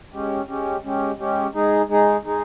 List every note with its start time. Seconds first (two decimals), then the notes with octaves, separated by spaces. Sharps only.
0.13 G#3 C#4 G4
0.48 G#3 C#4 G4
0.84 G#3 C#4 G4
1.19 G#3 C#4 G4
1.54 G#3 D#4 G#4
1.89 G#3 D#4 G#4
2.23 G#3 D#4 G#4